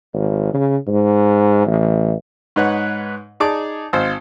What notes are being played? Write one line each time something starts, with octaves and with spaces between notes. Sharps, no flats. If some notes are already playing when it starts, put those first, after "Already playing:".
G#1
C#3
G#2
A1
G#2 D#4 B4 C#5 F#5
D#4 G#4 D5 A5 D6
G#1 C5 F5 E6